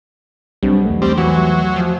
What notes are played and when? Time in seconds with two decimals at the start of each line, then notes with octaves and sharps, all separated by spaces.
0.63 B1 G3 C4 D4
0.85 E2 A3
1.02 G3 C4
1.17 E3 F#3
1.76 F3